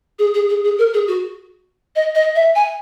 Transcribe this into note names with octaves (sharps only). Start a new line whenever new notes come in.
G#4
G#4
G#4
G#4
A#4
G#4
F#4
D#5
D#5
E5
G#5